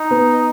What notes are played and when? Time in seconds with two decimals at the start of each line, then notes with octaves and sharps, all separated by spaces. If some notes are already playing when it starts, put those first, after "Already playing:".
Already playing: D#4
0.11 B3 B4